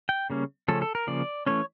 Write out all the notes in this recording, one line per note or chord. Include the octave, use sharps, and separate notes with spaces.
G5
C#3 G3 A#3 C#4
C#3 F3 A3 C#4 A4
A4
A#4
C#3 F3 A#3 D5
E3 A3 C#4 C#5